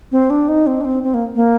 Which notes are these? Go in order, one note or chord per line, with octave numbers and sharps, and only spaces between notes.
C4
D4
D#4
C4
D4
C4
C4
A#3
A#3